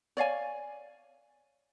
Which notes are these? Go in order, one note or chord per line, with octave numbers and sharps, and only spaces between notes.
C#5 D5 F5 G#5